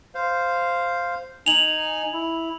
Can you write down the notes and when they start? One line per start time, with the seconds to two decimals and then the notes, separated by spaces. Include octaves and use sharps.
0.15 C5 F5
1.46 D#4 G#5 F7 F#7
2.13 E4